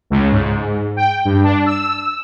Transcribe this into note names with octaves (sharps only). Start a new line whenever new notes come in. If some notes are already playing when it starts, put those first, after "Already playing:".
C#2
G#2
G5
G2
D4
E6